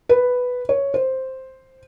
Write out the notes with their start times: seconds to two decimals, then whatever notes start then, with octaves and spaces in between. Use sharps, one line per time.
0.09 B4
0.69 C#5
0.94 C5